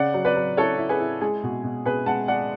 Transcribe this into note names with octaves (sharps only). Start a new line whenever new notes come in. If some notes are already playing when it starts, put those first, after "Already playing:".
Already playing: C#3 D5 F#5
F#3
B4 D5
F#3
E4 A4 C#5
E4
G#4 B4
E4
G#3 G#4
B2
B2
B2 G#4 B4
G#3 F#5 A5
G#3 D5 F#5